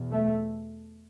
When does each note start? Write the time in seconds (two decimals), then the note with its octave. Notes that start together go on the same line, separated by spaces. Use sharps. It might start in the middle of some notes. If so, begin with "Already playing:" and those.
Already playing: E2 B2
0.11 A3